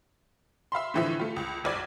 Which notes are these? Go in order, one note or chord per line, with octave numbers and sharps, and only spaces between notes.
E5 F5 B5 C6
A2 D3 E3 F3 E5
A3 F4
C#2
F#1 B1 D5 G#6